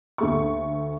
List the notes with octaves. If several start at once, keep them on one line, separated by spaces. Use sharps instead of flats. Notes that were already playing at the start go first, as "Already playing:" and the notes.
D2 A3 C#6